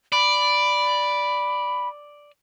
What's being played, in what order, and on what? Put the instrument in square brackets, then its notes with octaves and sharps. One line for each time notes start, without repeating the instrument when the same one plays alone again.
[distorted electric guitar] D5 [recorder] B5